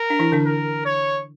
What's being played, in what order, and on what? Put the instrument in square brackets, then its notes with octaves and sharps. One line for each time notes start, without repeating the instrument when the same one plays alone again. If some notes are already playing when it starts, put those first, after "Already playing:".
Already playing: [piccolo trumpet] A#4
[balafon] D4
E3 E4
D3 D4
[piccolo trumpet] A#4
C#5